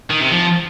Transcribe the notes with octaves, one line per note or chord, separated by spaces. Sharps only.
D#3
C3
F3